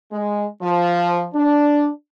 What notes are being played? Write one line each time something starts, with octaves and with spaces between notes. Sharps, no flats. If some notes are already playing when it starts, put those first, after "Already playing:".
G#3
F3
D4